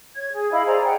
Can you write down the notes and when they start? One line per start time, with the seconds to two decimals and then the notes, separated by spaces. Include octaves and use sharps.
0.16 C#5 G#6
0.32 G#4
0.51 E4 D#5 F5 B5
0.66 G#4 C5 D5 A#5
0.83 F#5 G5